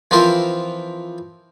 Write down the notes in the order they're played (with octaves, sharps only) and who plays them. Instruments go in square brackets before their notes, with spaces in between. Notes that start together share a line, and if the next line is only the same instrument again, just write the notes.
[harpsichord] E3 F3 C4 F4 A#4 E5